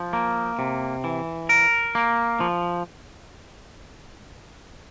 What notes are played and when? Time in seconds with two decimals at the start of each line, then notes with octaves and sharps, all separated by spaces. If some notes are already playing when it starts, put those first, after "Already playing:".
Already playing: F3
0.13 A#3
0.59 C3
1.04 E3
1.49 A#4
1.95 A#3
2.40 F3